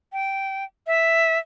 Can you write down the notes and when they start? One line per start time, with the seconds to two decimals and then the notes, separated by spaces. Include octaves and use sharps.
0.13 G5
0.87 E5